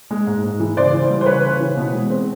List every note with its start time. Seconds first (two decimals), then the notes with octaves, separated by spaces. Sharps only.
0.11 G#3
0.27 G#2
0.43 G#2
0.60 E3
0.77 C#3 C5 D5
0.94 E3
1.10 G3
1.21 C5
1.26 C#3 B4 C#5
1.43 C#3
1.60 E3
1.76 B2
1.93 G#3
2.10 C4